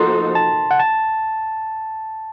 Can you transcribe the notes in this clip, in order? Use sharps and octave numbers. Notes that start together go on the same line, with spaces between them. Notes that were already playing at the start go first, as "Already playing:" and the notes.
Already playing: F3 A#3 D#4 F#4 A4 C6
A5
F#5
A5